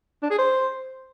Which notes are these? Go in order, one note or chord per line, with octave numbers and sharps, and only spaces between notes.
D4
G#4
C5